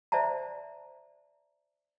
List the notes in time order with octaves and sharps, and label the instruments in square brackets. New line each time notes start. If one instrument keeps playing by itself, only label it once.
[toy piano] C5 D5 E5 A5 A#5